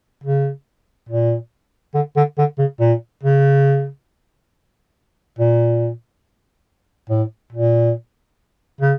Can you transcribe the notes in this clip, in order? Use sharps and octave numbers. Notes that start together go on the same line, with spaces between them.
C#3
A#2
D3
D3
D3
C#3
A#2
C#3
A#2
A2
A#2
C#3